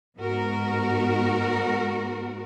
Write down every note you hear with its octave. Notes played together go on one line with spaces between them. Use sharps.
G#2 B3 F#4 A#4